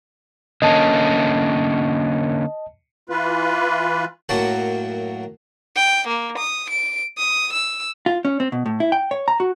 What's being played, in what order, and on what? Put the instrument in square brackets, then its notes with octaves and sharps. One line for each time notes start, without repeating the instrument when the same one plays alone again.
[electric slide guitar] D3 A#3 C#4 [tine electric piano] D#5 A5
[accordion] E3 F4 B4
[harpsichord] F#2 A2 F#3 A#3 F#4 A5
[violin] G5
A#3
D#6
D7
D#6
E6
[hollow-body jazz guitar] F4
C#4
C4
B2
A2
E4
G5
C#5
A#5
F#4